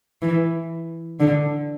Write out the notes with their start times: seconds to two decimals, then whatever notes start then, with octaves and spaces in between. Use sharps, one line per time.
0.22 E3
1.20 D3